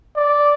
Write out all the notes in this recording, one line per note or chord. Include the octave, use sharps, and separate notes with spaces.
D5